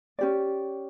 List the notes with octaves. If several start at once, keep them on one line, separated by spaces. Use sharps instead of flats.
C#4 G4 D5